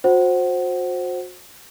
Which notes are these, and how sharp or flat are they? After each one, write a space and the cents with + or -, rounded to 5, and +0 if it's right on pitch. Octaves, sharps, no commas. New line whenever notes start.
F#4 -35 C5 +10 F#5 +20